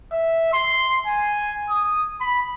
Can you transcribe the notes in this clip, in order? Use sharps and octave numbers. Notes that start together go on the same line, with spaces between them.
E5
C6
G#5
D#6
B5